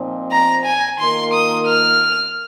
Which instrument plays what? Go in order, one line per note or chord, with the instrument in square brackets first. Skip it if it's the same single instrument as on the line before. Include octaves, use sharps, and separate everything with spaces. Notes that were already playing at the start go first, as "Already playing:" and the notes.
Already playing: [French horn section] A#2 F3 C4 D#4
[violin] A#5
G#5
[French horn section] D#3 A#3 F4 A#4 [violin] C6
[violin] D#6
F6